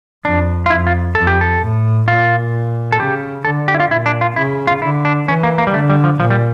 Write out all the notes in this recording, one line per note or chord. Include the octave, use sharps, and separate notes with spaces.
F2 D4
F4
F2 E4
F4
F2 A4
G4
A4
A2
A#2 F4
A4
C#3 G4
D3 A4
G4
E4
F4
A#2 E4
D4
F4
C#3 E4
F4
D3 E4
D4
E3 C#4
A#3
A#3
G3
D3 A3
G3
F3
A#2 F3
G3